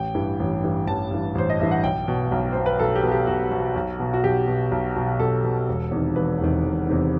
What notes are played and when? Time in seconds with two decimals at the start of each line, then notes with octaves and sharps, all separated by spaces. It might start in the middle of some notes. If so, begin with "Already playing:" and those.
Already playing: A1 G5
0.15 G2 E3
0.40 A1
0.64 G2 E3
0.87 A1 A5
1.11 G2 E3
1.35 A1 C5
1.50 D#5
1.59 G2 E3 E5
1.71 F#5
1.83 B1 G5
2.08 B2
2.32 B1
2.52 B2 C5
2.66 B4
2.79 B1 A4
2.96 G4
3.03 B2
3.11 G4
3.27 B1 F#4
3.51 B2
3.76 B1
4.00 B2
4.14 F#4
4.24 B1 G4
4.48 B2
4.71 B1
4.96 B2
5.19 B1 A4
5.44 B2
5.68 E1
5.91 E2 C3 D#3
6.16 E1 B4
6.40 E2 C3 D#3
6.64 E1
6.88 E2 C3 D#3